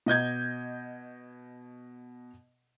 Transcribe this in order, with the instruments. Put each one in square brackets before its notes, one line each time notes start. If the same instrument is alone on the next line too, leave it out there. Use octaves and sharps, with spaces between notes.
[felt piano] B2 D#5 G6 G#6